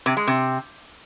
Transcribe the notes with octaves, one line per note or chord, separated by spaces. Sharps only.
C3
G#3
C3